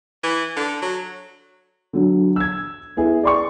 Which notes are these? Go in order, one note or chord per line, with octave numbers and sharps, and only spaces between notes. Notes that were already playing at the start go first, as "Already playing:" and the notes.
E3
D3
F#3
D3 F#3
E6 G#6
B3 E4 G#4
D5 C6 C#6